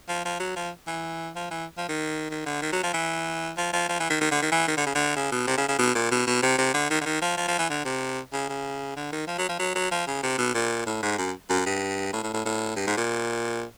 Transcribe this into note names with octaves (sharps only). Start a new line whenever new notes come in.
F3
F3
F#3
F3
E3
F3
E3
F3
D#3
D#3
D3
D#3
F#3
F3
E3
F3
F3
F3
E3
D#3
D#3
D3
D#3
E3
D#3
D3
C#3
D3
C#3
B2
C3
C#3
C#3
B2
A#2
B2
B2
C3
C3
D3
D#3
D3
D#3
F3
F3
F3
E3
D3
C3
C#3
C#3
D3
D#3
F3
F#3
F3
F#3
F#3
F3
C#3
C3
B2
A#2
A2
G#2
F#2
F#2
G2
A2
A2
A2
A2
G2
G#2
A#2